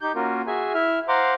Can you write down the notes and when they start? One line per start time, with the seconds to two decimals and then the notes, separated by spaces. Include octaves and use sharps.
0.01 D#4 G4 G6
0.15 A#3 C#4 F4 F#4 A#4
0.47 F#4 G#4 E5 G#5
0.74 E4 E5 F6
1.08 C5 F5 F#5 A#5 C6 D6